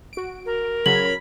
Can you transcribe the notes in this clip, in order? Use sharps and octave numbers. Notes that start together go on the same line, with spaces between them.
F#4 D7
A#4
C#3 F#3 B5 G#6 F#7